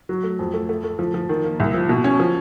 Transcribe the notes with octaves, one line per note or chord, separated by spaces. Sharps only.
F#3
A3
F2
A3
A3
A3
F3
F3
D#3
A#3
C2
F3
B2
C#4
F3